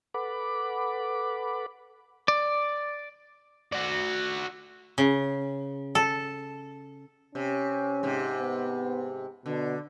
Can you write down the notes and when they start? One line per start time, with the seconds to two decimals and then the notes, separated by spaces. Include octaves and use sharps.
0.14 A4 B4 F#5 B5 D6
2.28 D5
3.73 F#4 D5
4.98 C#3
5.95 A4
7.35 C3 C#4
8.03 G#2 C3
8.40 B3
9.46 B2 D3